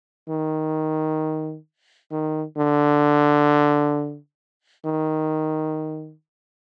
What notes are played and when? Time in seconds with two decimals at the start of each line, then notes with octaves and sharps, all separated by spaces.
0.29 D#3
2.12 D#3
2.57 D3
4.86 D#3